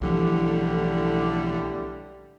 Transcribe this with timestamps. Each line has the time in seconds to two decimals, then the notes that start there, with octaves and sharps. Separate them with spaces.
0.01 B1 A2 D3 E3 F3 G3